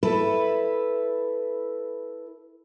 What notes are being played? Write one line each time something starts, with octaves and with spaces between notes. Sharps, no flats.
E4 A4 B4